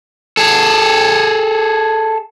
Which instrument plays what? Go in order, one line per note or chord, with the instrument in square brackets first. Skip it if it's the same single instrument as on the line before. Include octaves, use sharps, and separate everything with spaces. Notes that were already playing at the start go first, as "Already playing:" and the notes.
[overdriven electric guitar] G#4 A4